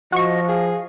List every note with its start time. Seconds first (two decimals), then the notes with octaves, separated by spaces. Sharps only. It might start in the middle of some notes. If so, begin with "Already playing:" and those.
0.12 F3 F#4 D#5 C#6
0.48 G#4 F5